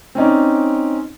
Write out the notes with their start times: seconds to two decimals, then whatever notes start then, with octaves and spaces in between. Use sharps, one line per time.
0.15 C4 C#4 D#4 D5